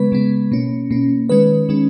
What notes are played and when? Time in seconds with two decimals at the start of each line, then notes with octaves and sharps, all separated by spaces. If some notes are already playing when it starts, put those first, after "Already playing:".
Already playing: C#3 G#3 B3 B4
0.12 C#3 G#3 B3
0.51 B2 A#3 C#4
0.91 B2 A#3 C#4
1.29 D#3 G#3 C#4 B4
1.69 D#3 G#3 C#4